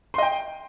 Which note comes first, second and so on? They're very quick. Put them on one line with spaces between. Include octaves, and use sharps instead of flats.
C6 D#5 G5